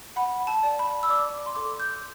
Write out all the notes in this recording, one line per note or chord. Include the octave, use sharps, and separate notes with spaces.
F#5 B5
A5
D5
B5
E6
D5 D6
C6
A4 D6
G6